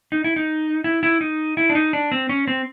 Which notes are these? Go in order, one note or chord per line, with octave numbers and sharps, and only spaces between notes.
D#4
E4
D#4
E4
E4
D#4
E4
D4
D#4
D4
C4
C#4
C4